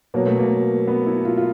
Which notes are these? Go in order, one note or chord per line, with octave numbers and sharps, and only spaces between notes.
B2 F#3 A#3
A3
A#3
B3
E4
F4
F4